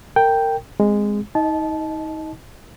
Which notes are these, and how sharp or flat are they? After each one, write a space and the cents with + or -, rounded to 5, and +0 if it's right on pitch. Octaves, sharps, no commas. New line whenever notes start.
A#4 -25 G5 +0
G#3 -10 C4 +0
D#4 +30 D#5 +0 A5 -20